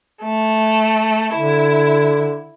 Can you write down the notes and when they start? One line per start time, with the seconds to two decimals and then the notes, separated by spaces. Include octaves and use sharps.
0.24 A3
1.35 D3 E4